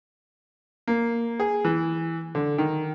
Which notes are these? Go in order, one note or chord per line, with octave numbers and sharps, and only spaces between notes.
A#3
G#4
E3
D3
D#3